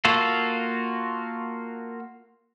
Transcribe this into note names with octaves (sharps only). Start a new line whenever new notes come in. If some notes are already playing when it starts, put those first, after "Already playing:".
A#3 F4 F#4 A4